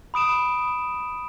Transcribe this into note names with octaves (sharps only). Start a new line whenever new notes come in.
B5 D#6 D7 E7